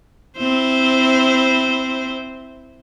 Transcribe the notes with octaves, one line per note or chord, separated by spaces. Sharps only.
C4 E4 C5